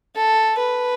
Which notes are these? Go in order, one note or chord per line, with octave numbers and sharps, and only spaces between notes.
A4
B4